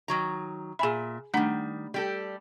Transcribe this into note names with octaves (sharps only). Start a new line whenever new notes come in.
D#3 F#3 A#5
A#2 G#4 E5 G#5 B5
D#3 G3 A3 D4 F#5
G3 G4 A4